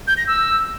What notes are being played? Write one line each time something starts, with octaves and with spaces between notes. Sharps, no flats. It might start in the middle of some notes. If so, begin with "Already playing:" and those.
G6
A#6
E6